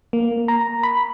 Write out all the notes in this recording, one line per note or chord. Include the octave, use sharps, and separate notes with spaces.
A#3
A#5
B5